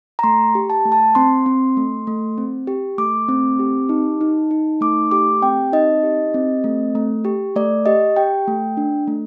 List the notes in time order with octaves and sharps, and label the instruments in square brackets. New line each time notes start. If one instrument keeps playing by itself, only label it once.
[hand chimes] A#5
A3 C6
G4
A5
A3
A5
C4 C6
C4
A3
A3
C4
G4
A3 D6
C4
G4
D#4
D#4
D#4
A3 D6
G4 D6
C4 G5
D#4 D#5
G4
C4
A3
A3
G4
A3 D5
G4 D#5
G4 G5
A3
D4
A3